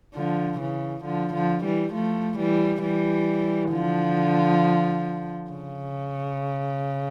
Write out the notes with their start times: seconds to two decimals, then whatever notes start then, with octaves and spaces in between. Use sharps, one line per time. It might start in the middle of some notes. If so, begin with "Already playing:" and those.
0.14 D3 F3
0.59 C#3 E3
1.04 D3 F3
1.34 D3 F3
1.64 E3 G3
1.93 F3 A3
2.38 E3 G3
2.83 E3 G3
3.72 D3 F3
5.51 C#3